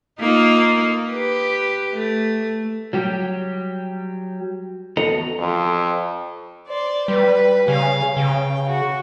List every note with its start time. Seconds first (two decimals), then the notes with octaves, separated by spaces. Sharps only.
0.20 A#3 D#4 F4
1.10 G4 B4
1.94 A3
2.93 F#3 G3 G4
4.97 E2 B3 F#4 A4 D#5 A#5
5.39 F2
6.68 C5 D5
7.08 G3 B4
7.68 C#3 F5 G#5
8.17 C#3 G5
8.69 F#4